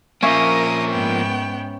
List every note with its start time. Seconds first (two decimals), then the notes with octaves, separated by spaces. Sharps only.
0.23 F3 A#3 C#4 A#4 E5 D#6
0.90 G#2 B3 G5